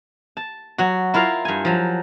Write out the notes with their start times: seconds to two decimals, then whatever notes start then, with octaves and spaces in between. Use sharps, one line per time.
0.37 A5
0.78 F#3 F#4
1.14 E4 F4 A#4 F5
1.45 G2 G#5
1.65 F3 F#3